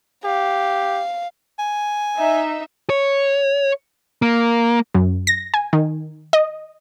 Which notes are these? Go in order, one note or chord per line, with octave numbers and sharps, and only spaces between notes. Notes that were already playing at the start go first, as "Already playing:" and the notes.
G4 F5
G#5
D#4 E5
C#5
A#3
F#2
A#6
G#5
D#3
D#5